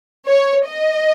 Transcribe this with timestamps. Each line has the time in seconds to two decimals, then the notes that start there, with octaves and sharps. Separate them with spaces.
0.28 C#5
0.67 D#5